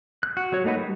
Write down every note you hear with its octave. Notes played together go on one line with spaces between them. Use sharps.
F#6
F#4
F#3 F#4 C#5
A3 A#3 D#4 F#4 B4
G3